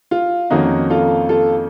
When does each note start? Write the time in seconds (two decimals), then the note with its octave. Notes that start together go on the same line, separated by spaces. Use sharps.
0.11 F4
0.50 F2 D#3 A#3 C#4 D#4 F#4
0.90 F4 A4
1.29 F4 A4